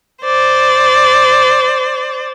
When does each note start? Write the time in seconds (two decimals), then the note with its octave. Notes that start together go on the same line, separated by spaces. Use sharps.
0.24 C5 D5